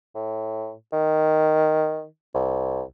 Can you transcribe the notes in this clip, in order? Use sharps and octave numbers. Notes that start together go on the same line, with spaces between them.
A2
D#3
C2